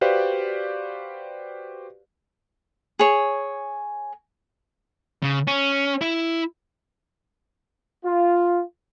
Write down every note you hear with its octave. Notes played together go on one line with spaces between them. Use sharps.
F#4 G4 B4 C5 D5 F5
G#4 C#5
C#3
C#4
E4
F4